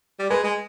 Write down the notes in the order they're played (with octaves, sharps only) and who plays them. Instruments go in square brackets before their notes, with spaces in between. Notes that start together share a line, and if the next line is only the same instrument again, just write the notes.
[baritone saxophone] G3
[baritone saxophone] G#3 [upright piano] B4
[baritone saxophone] G#3